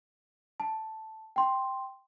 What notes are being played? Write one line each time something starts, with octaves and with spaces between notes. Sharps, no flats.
A5
G5 C6